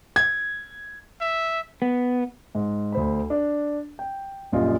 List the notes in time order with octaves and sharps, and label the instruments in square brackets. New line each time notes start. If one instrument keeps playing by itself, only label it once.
[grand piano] G#6
[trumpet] E5
[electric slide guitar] B3
[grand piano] G#2
D2 C5 B5
D4
G5
A#1 F#2 G3 F4 D#5